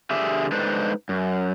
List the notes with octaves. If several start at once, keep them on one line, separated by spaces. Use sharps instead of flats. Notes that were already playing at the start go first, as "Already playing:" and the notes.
D3 G4 G#4 E5
G#3 D4 D#4 A4 B4 C5
F#2